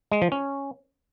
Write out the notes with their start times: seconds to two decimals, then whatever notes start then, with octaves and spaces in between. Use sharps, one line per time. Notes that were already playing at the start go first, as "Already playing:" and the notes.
0.12 G#3
0.22 F3
0.32 C#4